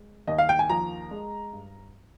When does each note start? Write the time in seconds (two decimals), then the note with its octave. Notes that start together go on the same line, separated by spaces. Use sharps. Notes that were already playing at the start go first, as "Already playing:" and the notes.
Already playing: G#3
0.27 D#2 D#5
0.38 F5
0.49 G5
0.59 G#5
0.69 F3 A#5
1.11 G#3
1.52 G2